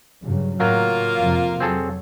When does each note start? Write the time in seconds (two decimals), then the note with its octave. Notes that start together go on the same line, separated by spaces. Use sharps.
0.22 G2 C#3 F#3
0.60 A2 F#3 A#3 F4 A#4
1.18 F2 C3 F3
1.60 F#3 C4 G#4 A4